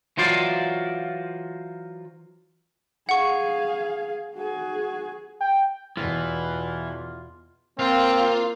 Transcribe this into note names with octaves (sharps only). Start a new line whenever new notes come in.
E3 F#3 F4 C5 D5
G#4 F5 F#5 C#6
F#4 G#4
G5
E2 B2 E3 F4
A#3 C4 F4